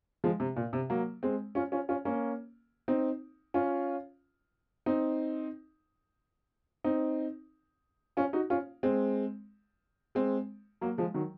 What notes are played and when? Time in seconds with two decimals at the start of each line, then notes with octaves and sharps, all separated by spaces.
0.24 F3 G#3
0.40 C3
0.56 A#2
0.73 C3
0.90 F#3 A#3
1.23 G#3 C4
1.55 C#4 F4
1.72 C#4 F4
1.89 C#4 F4
2.05 A#3 C#4
2.88 C4 D#4
3.54 C#4 F4
4.86 C4 D#4
6.84 C4 D#4
8.17 C#4 F4
8.33 D#4 F#4
8.50 C#4 F4
8.83 G#3 C4
10.15 G#3 C4
10.81 F#3 A#3
10.98 F3 G#3
11.14 D#3 F#3